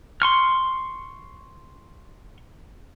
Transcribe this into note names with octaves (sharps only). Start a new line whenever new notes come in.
C6 C#6 F6